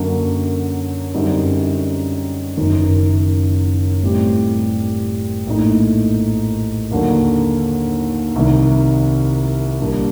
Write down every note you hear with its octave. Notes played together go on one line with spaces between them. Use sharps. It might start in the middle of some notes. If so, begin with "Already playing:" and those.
Already playing: F#2 D3 F#3 A#3
F#2 D3 G3 C4 D#4
F#1 F#2 D#3
A2 G3 C4 G4
A#1 A2 A3 D#4
D#2 D3 F#3 A#3 F#4
C2 C3 D#3
A#1 A#2 G3 A#3 D4